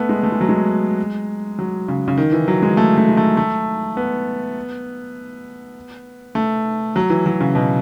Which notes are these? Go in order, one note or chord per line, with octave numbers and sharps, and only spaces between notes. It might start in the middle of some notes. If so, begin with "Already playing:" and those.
Already playing: A3 B3
G#3
A3
G#3
F#3
G#3
F#3
C#3
C#3
D#3
E3
F#3
G#3
A3
A3
G#3
A3
A3
B3
A3
F#3
E3
F#3
C#3
B2